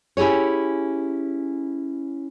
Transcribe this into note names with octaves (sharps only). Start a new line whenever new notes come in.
C#4 E4 G4 G#4 C#5